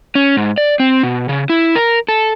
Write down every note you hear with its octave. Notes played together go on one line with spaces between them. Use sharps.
C#4
G#2
D5
C4
B2
C#3
E4
A#4
A4